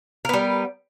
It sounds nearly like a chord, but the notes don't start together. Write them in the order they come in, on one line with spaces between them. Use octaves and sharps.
A#4 B3 G3